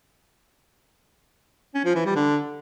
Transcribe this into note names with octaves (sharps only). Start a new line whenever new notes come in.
C#4
F3
E3
G3
D3